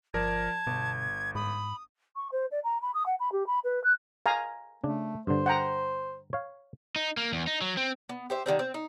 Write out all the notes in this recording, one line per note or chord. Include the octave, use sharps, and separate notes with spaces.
G1 F3 A#4 D5 A5 G#6
G1 B2
G#2 B5 D#6
C#6
C5
D5
A#5
B5
D#6
F#5
B5
G4
B5
B4
F#6
F5 G#5 A#5
C#3 A3 D4
G2 D3 C5
F#5 G5 A#5
C#5 F5
D#4
A#3
E2
D#4
F#3
C4
B3
G4 C5 E5
D3 D#3 G3 C4
C4
D#4